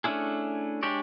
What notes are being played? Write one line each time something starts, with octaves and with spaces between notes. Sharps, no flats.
A3 C#4 D4 E4 G#4
G#3 D4 G4 C#5 D5